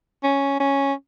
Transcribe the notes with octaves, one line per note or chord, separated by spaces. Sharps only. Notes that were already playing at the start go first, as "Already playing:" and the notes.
C#4
C#4